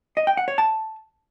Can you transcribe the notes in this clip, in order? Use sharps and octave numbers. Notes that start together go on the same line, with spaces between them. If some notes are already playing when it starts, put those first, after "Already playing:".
D#5
G5
F#5
C#5
A5